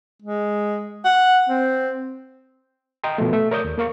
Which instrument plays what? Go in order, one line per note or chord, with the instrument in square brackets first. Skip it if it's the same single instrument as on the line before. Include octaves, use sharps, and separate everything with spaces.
[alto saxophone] G#3
F#5
C4
[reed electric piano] D#5 G5 A#5 C6
B2 F3 A3
A3 E5
A#4 C#5 D5 D#6 G6
D#2
A#3 A#4 F5 C#6